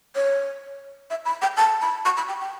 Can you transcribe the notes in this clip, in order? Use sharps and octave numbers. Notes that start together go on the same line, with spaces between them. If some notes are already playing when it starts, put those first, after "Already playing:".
C#5
E5
B5
G5
A5
B5
C#6
B5
G5
G5